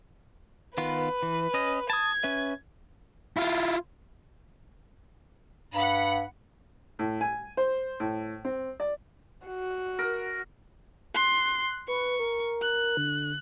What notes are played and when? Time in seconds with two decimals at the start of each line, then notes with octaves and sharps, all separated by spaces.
0.78 D#3 B3 F4 B4
1.23 E3
1.54 C#4 D#5
1.90 A5 D#6 G#6
2.23 C#4 B4 E5
3.37 E4 F4
5.74 G2 F#5 B5
6.99 A2
7.21 G#5
7.57 C5
8.00 A2
8.45 C4
8.80 D5
9.47 F#4
9.99 A#4
11.15 C6 F#6
11.88 B4 C#6
12.20 A#4
12.62 F#6
12.97 D3